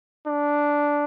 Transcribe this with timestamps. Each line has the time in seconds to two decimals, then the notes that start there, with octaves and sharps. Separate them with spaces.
0.27 D4